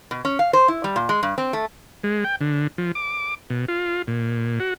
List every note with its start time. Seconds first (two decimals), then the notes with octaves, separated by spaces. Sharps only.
0.11 B2
0.25 C#4
0.39 F5
0.53 C5
0.68 E4
0.84 G3
0.96 A#2
1.09 G#3
1.23 G2
1.38 C4
1.53 A3
2.03 G#3
2.24 G5
2.41 D3
2.78 F3
2.95 D6
3.50 B2
3.68 F4
4.08 A#2
4.60 F#4